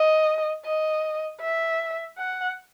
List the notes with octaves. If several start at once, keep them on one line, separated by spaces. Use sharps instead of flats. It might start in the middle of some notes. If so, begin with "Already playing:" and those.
Already playing: D#5
D#5
E5
F#5